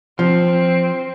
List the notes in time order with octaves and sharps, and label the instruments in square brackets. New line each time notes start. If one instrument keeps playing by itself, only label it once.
[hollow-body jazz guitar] F3 [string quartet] C4